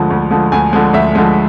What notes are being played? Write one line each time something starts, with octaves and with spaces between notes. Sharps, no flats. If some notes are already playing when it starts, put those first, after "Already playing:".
Already playing: D2 D3 F3 G#3
D2
D3 F3 G#3
D2 G#5
D3 F3 G#3
D2 E5
D3 F3 G#3